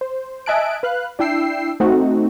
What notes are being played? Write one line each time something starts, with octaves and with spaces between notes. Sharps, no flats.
C5
D#5 E5 G#5 A5 F#6 D7
B4 F5 F#6
D4 E4 G5 E6 C7
A3 C4 D#4 F#4